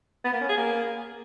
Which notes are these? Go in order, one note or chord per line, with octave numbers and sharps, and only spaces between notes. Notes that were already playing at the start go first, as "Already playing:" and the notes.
B3
A#3
C#4
G#4
A#3